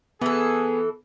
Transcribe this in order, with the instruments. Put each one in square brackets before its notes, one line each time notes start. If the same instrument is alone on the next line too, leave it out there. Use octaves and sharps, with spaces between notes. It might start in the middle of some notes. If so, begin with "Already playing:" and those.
[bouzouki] E3 A4 [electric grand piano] B3 [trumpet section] G#4